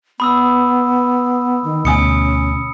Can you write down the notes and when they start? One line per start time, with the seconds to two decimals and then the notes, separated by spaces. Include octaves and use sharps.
0.20 B3 B5 D#6 E6
1.64 D#3
1.85 D2 B2 C#4 G#5 D#6 C#7